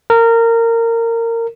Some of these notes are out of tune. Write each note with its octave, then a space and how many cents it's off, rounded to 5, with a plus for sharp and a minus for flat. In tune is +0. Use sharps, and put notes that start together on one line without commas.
A#4 -20